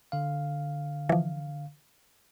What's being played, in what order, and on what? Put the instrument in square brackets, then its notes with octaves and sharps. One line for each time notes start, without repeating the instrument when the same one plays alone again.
[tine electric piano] D3 F5
[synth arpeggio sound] E3 F3